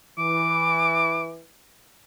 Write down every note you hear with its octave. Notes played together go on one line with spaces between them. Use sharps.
E3 D6